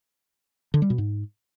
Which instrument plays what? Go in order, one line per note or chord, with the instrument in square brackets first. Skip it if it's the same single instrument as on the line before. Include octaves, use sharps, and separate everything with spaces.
[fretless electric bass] D3
G3
B2
G#2